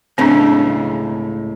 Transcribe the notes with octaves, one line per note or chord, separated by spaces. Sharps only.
C#2 A2 C#3 C4 D4